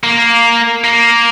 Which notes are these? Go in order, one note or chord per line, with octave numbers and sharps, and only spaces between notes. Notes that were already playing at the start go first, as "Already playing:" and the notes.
A#3
A#3